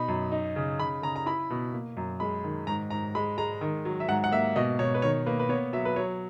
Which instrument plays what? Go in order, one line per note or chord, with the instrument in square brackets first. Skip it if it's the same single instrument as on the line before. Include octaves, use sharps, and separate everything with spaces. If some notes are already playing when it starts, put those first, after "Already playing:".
Already playing: [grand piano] B2 D#4 B5
F#2
D#4
C#3
C#3 B5
C#3 A#5
A#5
E4 B5
B2
A#3
F#2
G#3 B5
D#3
G#2 A#5
G#2 A#5
G#3 B5
G#3 A#5
D#3
F#3
E5
G#2 F#5
F#5
A#3 E5
B2 D#5
B2 C#5
B4
D#3 C#5
A#3 B4
B4
B3 C#5
F#3 E5
B4
F#3 C#5